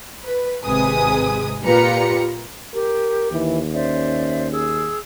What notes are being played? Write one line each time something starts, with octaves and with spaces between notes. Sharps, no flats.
B4
G#1 C3 G#3 B4 G#5 D#6
A#2 F4 G4 B4 A#5 C#7
G4 A#4
D#2 E3
C#4 C5 D5 E5
G#4 E6